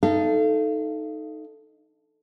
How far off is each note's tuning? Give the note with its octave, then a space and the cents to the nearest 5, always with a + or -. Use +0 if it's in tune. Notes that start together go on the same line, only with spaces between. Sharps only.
D#4 +0 A4 +0 F5 -35